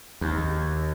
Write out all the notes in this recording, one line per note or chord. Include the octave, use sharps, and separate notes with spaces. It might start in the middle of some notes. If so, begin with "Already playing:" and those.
D#2